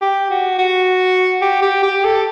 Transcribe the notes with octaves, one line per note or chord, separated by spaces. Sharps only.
G4
F#4
F#4
G4
G4
G4
A4